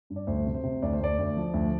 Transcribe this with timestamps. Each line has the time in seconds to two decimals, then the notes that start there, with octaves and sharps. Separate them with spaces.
0.10 G2
0.16 D5
0.27 D2 C5
0.46 C3
0.54 C5
0.64 C3
0.82 D2 D5
0.93 C5
1.00 D2 D5
1.19 D2
1.37 F3
1.54 D2